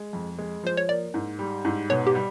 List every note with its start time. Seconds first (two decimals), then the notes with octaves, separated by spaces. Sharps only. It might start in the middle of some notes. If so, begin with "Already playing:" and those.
Already playing: G#3
0.13 F2
0.38 G#3
0.64 F3 C5
0.77 C#5
0.88 A#3 D5
1.14 G#2
1.39 G3
1.65 G#2
1.90 B2 C#5
2.07 G4
2.15 G3